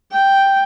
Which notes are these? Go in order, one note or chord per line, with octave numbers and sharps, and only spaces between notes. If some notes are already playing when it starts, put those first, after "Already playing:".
G5